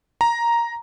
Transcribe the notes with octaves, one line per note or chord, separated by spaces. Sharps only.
A#5